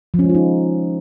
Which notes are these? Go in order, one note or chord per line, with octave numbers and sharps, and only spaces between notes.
F3
C#4
G#3
F4
D#4